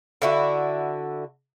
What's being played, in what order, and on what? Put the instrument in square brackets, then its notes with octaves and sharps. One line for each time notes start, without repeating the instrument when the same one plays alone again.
[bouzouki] D3 E4 F#4